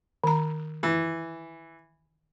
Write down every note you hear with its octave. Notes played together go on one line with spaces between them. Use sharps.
D#3 A#5
E3